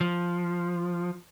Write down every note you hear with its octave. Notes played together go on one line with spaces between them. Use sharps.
F3